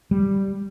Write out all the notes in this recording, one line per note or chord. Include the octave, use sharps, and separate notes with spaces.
G3